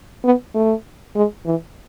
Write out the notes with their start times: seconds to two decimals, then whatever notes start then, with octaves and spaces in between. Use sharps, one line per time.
0.24 B3
0.55 A3
1.16 G#3
1.46 E3